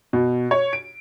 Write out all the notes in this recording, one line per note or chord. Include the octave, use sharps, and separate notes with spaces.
B2
C#5
D7